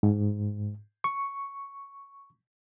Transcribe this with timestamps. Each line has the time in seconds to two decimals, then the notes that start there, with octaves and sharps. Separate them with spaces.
0.03 G#2
1.04 C#6